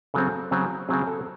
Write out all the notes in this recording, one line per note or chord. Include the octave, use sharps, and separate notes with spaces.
C#3 F#3 C4 A4
C#3 F#3 C4
C#3 F#3 C4 G#4
A4